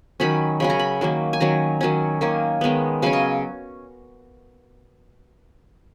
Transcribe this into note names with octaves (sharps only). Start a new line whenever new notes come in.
D#3 F#3 C#4 B5
C#3 F#3 C#4 B5
A#5
B5
D#3 F#3 A#3
G#5
D#3 F#3 C#4 A#5
D#3 F#3 C#4
D#3 A#3 C#4
D#3 G#3 B3
C#3 F#3 C#4 F5
D#5